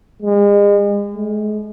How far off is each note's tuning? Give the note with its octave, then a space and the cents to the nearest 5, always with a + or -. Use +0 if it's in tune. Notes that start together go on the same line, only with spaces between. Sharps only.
G#3 -35
G#3 +35